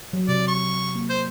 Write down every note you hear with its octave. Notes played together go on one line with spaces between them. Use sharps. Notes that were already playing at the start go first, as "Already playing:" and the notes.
F#3
C3 D5
C#6
A#3
C5